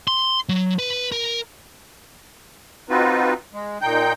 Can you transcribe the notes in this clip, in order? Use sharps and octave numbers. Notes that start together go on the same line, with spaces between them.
C6
F#3
B4
A#4
C4 D#4 F4 F#4 B4
G#3
A#2 D#4 G5 G6